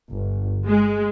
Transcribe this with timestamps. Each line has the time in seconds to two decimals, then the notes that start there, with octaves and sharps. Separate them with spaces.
0.12 G1
0.66 G#3